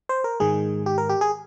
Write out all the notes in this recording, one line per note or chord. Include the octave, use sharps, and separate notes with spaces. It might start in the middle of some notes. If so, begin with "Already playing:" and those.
C5
A#4
G#2 D#3 G#3 G#4
G4
A#4
G4
G#4